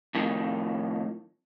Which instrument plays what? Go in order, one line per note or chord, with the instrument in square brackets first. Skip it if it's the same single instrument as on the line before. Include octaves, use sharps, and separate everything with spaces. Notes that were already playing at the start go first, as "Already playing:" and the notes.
[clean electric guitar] F2 A2 D#3